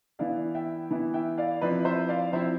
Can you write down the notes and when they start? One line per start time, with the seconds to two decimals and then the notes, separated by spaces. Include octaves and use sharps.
0.19 E3 B3 E4 D5 F5
0.54 E5 G5
0.90 E3 B3 E4
1.14 E5 G5
1.38 D5 F5
1.61 F3 C4 E4 B4 D5
1.85 C5 E5
2.09 D5 F5
2.33 F3 C4 E4 C5 E5